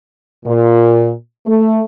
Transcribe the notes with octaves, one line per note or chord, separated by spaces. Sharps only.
A#2
A3